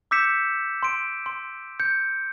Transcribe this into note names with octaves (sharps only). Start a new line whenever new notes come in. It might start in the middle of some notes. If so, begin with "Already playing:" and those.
D6 E6 G6 B6 C#7 E7
C6 D7
C6
G6 C#7